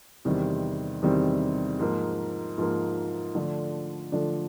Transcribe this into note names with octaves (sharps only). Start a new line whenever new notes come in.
E2 C3 D#3 G3 C4
E2 C3 D#3 G3 C4
G#2 F3 A#3
G#2 F3 A#3
D3 F3 A3 D4
D3 F3 A3 D4